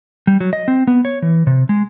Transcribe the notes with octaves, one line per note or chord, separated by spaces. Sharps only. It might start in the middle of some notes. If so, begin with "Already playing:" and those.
G3
F#3
D#5
C4
B3
C#5
E3
C3
G#3